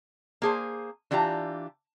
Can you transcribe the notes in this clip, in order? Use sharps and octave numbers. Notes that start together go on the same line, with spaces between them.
A#3 G#4 C5
E3 D4 F4 G4 A#5